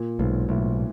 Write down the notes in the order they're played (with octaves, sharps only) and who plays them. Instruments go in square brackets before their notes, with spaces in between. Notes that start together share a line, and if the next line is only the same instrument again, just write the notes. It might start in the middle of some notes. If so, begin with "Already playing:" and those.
Already playing: [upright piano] A#2
[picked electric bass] B1 [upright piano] G#2
[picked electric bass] B1 [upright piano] A2